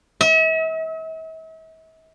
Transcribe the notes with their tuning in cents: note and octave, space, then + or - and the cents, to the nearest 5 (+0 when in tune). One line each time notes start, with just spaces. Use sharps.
E5 -45